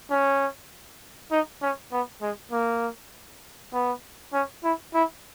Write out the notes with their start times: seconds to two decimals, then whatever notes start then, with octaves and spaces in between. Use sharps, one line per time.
0.10 C#4
1.31 D#4
1.62 C#4
1.92 B3
2.22 G#3
2.52 A#3
3.73 B3
4.33 C#4
4.64 E4
4.94 E4